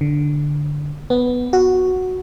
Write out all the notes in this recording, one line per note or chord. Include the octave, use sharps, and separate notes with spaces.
D3
B3
F#4